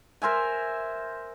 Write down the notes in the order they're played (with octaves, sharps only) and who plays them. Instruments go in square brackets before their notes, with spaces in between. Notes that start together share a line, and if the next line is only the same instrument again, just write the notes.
[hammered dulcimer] A#4 C5 E5 G#5